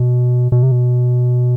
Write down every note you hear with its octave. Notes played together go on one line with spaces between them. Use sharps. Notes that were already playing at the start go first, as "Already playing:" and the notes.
Already playing: B2
B2
C3
B2